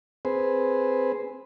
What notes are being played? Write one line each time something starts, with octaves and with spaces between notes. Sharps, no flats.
C4 G#4 B4 C5